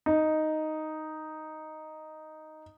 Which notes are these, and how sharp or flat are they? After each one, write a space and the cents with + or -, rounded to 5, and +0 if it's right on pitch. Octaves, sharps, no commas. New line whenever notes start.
D#4 +0